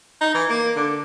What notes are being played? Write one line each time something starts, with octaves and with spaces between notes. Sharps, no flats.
D#4
E3
A#3
D3